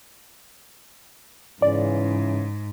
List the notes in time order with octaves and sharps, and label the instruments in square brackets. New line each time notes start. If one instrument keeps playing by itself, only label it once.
[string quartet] G#2 [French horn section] C#3 E3 C#4 [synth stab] D5